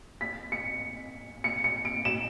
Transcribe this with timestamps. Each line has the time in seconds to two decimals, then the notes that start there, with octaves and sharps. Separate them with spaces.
0.21 B6
0.52 C#7
1.44 C#7
1.64 C#7
1.85 D7
2.05 E7